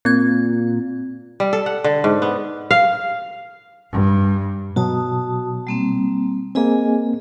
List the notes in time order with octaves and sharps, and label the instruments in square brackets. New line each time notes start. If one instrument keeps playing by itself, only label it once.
[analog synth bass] A#2 [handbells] C4 G#6
[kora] G3
A4
F#5
D3
G#2
B3
F5
[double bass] G2
[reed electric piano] B2 F#3 [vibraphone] F#4 A5 D#6
[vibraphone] G3 A#3 C4
[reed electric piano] A#3 C4 [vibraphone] G#4 D#5 G#5